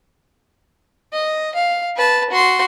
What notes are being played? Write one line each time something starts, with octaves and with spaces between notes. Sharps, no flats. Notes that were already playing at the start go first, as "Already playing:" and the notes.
D#5
F5
B4 A5
F#4 C6